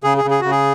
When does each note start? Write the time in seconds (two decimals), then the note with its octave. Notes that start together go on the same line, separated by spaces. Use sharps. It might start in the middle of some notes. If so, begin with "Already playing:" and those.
0.04 C#3 G#4
0.18 G#4
0.24 C#3
0.31 G#4
0.41 C#3 F#4
0.51 G#4